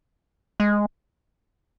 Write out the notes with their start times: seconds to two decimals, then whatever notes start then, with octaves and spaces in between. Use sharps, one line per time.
0.60 G#3